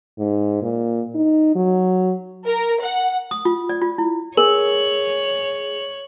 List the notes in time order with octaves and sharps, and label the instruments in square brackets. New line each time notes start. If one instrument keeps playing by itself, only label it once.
[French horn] G#2
A#2
D#4
F#3
[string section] A#4
F#5
[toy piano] D#6
F4
D5
F4
E4
[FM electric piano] G#4 [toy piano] A#4 [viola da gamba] C#5 [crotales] F#7